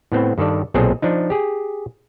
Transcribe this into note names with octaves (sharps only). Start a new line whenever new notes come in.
A2 B3 C4
G2 D#3 A4 D5
B1 A#2 C4 G#4 A4 D#5
F3 D4 D#4
G4 G#4